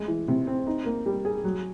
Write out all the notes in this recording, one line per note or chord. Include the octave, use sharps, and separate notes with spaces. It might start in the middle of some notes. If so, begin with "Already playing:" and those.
Already playing: G#3
E3
C3
C4
D#4
A#3
G3
G#4
F#3